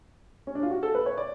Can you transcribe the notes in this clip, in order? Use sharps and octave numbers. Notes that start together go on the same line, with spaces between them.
C#4
D4
F4
F#4
A4
B4
C#5
D5